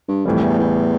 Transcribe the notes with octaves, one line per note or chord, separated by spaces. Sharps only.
G2
F2 A2 E3 G3
E2
E2